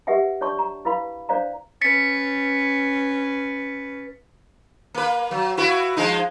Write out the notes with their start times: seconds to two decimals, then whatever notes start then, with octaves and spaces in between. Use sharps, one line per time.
0.07 G4 A#4 B4 E5 F#5 G#5
0.41 D4 C#5 D5 A5 C#6
0.59 A#5
0.85 E4 B4 F5 B5
1.29 D4 C5 D5 F5 A#5
1.81 C#4 B4 A6 B6 C#7
4.94 A#3 B4
5.31 F#3
5.57 E4 F#4 B4
5.97 F3 G#3 D#4